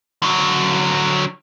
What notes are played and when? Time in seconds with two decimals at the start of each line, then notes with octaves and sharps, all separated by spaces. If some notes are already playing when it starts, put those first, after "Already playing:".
0.23 D3 F#3